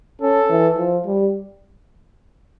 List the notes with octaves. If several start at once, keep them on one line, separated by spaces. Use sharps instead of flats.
C#4 A4
E3
F3
G3